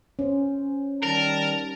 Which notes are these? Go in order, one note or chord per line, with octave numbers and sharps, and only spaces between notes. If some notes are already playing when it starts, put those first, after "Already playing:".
C#4 C5
D#3 G3 A#4 A5